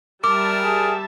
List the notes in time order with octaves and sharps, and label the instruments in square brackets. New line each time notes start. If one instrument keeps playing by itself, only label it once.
[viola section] G3 E5 A5 [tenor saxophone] A#4 [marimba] D6
[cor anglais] G#4